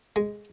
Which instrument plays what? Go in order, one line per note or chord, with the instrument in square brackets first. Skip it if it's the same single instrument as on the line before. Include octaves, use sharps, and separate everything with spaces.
[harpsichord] G#3